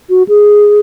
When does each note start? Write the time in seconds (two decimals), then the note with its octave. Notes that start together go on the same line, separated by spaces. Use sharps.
0.09 F#4
0.28 G#4